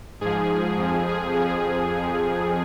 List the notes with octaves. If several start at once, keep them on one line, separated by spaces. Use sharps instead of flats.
G#2 F3 G#4
F2 F3
G#4
F2 F3 G#4